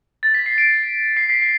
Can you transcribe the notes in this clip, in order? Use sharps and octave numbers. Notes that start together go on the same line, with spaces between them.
A6
B6
C7
D7
C7
B6
C7